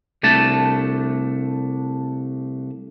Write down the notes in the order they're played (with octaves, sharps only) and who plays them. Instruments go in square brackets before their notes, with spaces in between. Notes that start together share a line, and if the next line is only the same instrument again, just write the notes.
[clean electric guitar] C2 A3 D4 A5